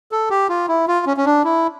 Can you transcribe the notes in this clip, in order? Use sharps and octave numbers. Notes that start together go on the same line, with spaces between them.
A4
G4
F4
E4
F4
C#4
C#4
D4
E4